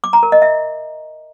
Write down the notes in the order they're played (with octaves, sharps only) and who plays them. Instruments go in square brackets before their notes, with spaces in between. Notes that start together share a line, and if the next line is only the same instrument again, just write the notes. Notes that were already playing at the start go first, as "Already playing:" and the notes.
[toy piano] D6
A#5
A#4
D#5
E5